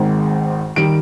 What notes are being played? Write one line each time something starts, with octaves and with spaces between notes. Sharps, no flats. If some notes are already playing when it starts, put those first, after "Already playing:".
Already playing: G#1 G#2 D#3 G#3
D#3 G3 D7